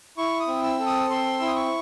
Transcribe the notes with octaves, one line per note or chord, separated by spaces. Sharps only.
E4 C#6
D#6
C4
E6
A4
D#6
C4 C6
E4 E6
D#6
C#6